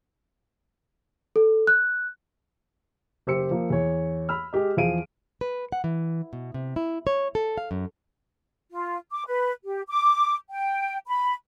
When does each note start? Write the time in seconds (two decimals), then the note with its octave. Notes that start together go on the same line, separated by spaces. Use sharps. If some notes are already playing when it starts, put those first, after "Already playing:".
1.36 A4
1.67 F#6
3.27 F#1 G4 C5 E6 C#7
3.51 F3 A#3
3.70 E2 C#5
4.29 B5 E6 F6
4.53 G#3 G4 D#5
4.77 E2 F3 G#4 F5 D7 D#7
5.41 B4
5.72 F#5
5.84 E3
6.33 B2
6.54 C3
6.76 E4
7.07 C#5
7.35 A4
7.58 F5
7.71 F#2
8.71 F4
9.11 D6
9.27 B4
9.64 G4
9.88 D6
10.51 G5
11.07 B5